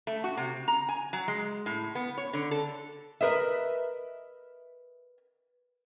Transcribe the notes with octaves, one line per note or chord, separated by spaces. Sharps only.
A3
F#4
C3
A#5
G#5
F#3
G#3
A2
B3
C#5
D3
A4
A#4 B4 D#5 E5